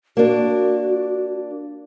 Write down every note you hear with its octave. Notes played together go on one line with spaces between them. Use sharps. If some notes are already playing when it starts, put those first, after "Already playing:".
A#3 D4 F#4